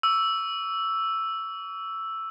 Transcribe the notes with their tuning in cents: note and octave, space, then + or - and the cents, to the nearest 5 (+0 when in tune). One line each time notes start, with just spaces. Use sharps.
C#6 +45 E6 +0